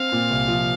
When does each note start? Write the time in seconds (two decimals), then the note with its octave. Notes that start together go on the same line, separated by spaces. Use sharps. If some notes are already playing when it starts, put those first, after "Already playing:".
Already playing: C4 F5
0.12 A#2
0.30 C2
0.48 F3